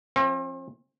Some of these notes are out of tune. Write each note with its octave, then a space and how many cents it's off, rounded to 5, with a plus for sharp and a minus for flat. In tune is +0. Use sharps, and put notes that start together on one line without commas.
F3 +0 C4 +40